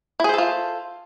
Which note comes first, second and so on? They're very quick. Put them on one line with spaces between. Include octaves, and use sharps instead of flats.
E4 G#4 C5 A4 F4